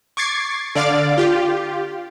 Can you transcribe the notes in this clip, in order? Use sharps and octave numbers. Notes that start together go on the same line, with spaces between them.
C#6 D6 G#6 A6 C7
D3 D5 F5 D6 A6
F4 G4